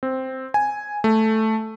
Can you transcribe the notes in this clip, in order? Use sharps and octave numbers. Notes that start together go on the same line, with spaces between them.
C4
G#5
A3